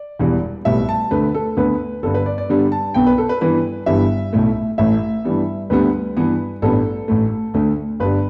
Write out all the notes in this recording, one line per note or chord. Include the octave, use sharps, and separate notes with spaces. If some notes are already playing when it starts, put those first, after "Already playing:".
Already playing: D5
E1 E2 E3 G3
B1 A2 G3 B3 E5
A5
D2 D3 A3 B4
A4
D2 D3 B3 B4
G1 G2 D3 A4
B4
D5
D5
G2 D3 G3 B3
A5
B1 B2 B3 G5
B4
A4
B4
G2 E3 B3 B4
G1 G2 E3 G3 B3 E5
B1 A2 A3
A1 A2 A3 E5
G2 E3 G3 B3
D2 D3 G3 B3 B4
G2 E3 B3
A1 G2 G3 B3 A4
A1 A2 A3
D2 D3 A3
G1 G2 G3 B4